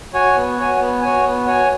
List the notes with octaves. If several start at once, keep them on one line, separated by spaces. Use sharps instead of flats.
F#4 C#5 G#5
B3
F#4 C#5 G#5
B3
F#4 C#5 G#5
B3
F#4 C#5 G#5